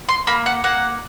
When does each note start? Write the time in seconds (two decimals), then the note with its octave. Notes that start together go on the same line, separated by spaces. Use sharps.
0.09 C6
0.27 A#3 B5
0.46 F#5
0.64 A#3 F#5